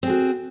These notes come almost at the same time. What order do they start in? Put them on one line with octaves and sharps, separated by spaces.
C4 G#4 F#4